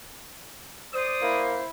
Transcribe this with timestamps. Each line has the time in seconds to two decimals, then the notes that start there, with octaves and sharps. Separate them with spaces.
0.94 C5 D5 D#6
1.22 A#3 E4